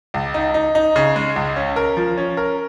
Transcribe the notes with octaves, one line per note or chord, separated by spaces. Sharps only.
C#2
D#4
D#4
D#4
C#3
G#3
C#2
C#4
A#4
F3
C#4
A#4